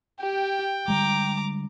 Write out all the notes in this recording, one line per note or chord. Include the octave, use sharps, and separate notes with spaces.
G4 G5
D3 G3 G#3 A#5 D6